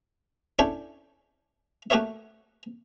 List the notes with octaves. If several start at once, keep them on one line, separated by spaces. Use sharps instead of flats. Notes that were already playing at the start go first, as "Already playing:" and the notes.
C#4 D4 E4 A4 G5 G#5
A3 F#4 G4 A#4 C#5 E5